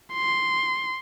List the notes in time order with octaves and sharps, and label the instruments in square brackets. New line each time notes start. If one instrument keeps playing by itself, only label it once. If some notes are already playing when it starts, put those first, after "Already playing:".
[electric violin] C6